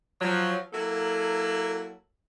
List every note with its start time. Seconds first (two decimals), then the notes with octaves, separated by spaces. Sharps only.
0.21 F3 F#3
0.73 F#3 A#3 E4 A4